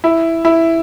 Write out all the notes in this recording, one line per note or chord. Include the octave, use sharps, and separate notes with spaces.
E4
E4